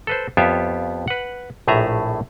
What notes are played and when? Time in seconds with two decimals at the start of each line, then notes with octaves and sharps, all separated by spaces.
0.07 A4 B4 C5
0.37 F2 B3 F4 G4 C#5 E5
1.08 B4 F#5
1.68 A#1 A2 A3 G#4 E5 A#5